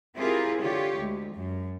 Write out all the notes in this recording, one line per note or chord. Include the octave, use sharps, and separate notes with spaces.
C4 E4 F4 G4 G#4 A#4
D3 F4 G4 C#5
D2 G#3
F#2